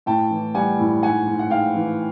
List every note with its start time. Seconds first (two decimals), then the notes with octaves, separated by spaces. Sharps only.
0.06 A2 G5 A5
0.31 E3
0.55 G3 F#5 G#5
0.79 A2
1.03 G#2 F#5 G#5
1.27 G#2
1.39 F#5
1.50 G#2 F5 G5
1.75 E3